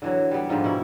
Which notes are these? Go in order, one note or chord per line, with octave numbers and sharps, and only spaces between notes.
D3 E3 F#3
G3 B3
G#2 D3 F3 D#4
B2 E4